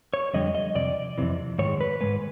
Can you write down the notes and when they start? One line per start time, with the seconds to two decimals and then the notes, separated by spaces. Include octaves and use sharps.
0.14 C#5
0.34 F2 D3 G3 D#5
0.55 D#5
0.75 F2 C3 D5
1.18 F2 C3 E3
1.58 G#2 D#3 G#3 C#5
1.81 B4
2.01 G#2 D#3 G#3 B4